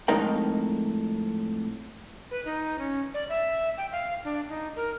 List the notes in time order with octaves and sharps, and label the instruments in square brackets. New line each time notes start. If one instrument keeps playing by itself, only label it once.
[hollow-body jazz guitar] F2 A2 G#3 D#4 A#4 G5
[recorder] B4
D#4
C#4
D5
E5
G5
F5
D4
D#4
A#4